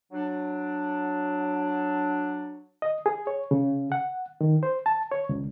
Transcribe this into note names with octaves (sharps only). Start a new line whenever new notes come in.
F#3 D4
D#5
G#4
C#5
C#3
F#5
D#3
C5
A5
C#5
C#2